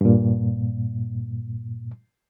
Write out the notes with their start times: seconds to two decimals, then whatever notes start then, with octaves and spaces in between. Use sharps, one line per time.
0.01 G2 A#2